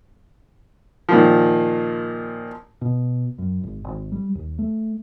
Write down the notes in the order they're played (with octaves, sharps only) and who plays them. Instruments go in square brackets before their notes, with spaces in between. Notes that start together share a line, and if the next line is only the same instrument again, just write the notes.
[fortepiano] A#2 D#3 F3
[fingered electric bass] B2
F#2
G#1
G#1
G3
D#2
A3